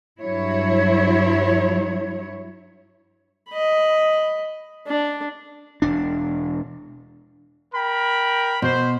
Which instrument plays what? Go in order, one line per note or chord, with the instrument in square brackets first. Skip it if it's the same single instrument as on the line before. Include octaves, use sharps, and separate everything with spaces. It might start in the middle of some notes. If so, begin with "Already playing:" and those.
[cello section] G2 F#3 E4 C#5
[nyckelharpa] D#5 B5
D4
[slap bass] E1 D4
[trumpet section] A#4 G5 B5
[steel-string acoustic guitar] B2 [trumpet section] C5